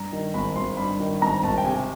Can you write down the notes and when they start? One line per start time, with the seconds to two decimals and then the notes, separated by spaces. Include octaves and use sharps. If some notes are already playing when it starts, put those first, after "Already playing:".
Already playing: G2 A#5
0.12 D#3
0.34 G#1 B5
0.56 G#1 C6
0.77 G2 B5
1.00 D#3
1.22 G#1 A#5
1.43 G#1 A5
1.58 G5
1.65 C3 G#5